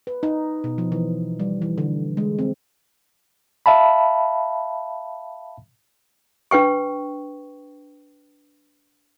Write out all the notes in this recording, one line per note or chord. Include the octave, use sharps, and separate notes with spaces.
B4
D#4
B2
F3
E3
G3
E3
D3
G#3
C4
E5 F5 A5 B5
D4 B4 G5 C#6